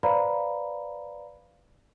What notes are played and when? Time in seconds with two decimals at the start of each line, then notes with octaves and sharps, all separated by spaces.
0.03 B4 C5 D5 F5 A#5 B5